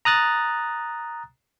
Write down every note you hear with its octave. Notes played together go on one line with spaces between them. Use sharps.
A#5 D#6 F#6 A6